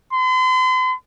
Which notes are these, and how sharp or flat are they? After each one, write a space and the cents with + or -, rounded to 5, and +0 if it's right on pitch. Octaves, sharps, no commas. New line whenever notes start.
C6 -40